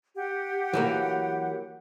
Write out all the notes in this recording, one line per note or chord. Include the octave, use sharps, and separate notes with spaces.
G4 F#5
E3 F#3 A#3